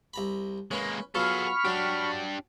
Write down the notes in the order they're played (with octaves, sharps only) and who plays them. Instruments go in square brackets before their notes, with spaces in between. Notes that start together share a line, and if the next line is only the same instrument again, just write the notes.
[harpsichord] C2 A#5 B5
[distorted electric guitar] G#3 A#3 [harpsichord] C#4 B4
[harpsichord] F#3 B3 F4 [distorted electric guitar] G#4 A4 [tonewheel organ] B5 C#6 F6
[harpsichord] F#3 [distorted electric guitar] D4 G4